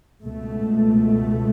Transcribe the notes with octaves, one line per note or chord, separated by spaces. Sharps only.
C#2 B2 A3